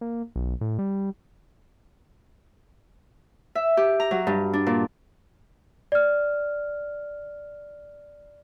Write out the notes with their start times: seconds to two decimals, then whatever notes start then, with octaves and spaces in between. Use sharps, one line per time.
0.01 A#3
0.36 B1
0.61 A2
0.79 G3
3.55 E5
3.77 G4
4.00 A#5
4.11 F#3
4.27 G2
4.53 D4
4.67 A#2
5.92 D5 F6